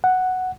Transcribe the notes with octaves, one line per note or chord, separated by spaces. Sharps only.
F#5